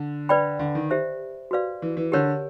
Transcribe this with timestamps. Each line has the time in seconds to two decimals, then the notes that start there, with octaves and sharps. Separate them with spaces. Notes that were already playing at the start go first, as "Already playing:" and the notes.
Already playing: D3
0.29 B4 D5 G5 B5
0.59 D3
0.75 D#3
0.91 G4 C5 E5
1.51 F#4 B4 D5 F5
1.82 E3
1.97 E3
2.12 D3 G4 A#4 C#5